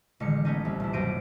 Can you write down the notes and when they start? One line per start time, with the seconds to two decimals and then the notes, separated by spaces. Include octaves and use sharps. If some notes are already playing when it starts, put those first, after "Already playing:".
0.20 A1 D3 D#3 G#3 C#7
0.45 A3 B3 C#4 D#4
0.65 C2
0.80 D#1 E4
0.93 B1 F#2 C5 A#6 D7 D#7